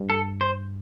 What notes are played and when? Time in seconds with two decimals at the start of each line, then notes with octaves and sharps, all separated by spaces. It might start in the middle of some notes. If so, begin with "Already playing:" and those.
Already playing: G2
0.10 A4
0.41 C5